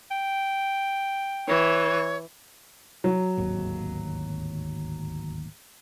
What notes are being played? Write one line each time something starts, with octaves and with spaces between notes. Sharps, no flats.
G5
E3 C#5
F#3
D1 G#1 D#2